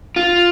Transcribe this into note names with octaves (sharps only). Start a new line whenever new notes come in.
F4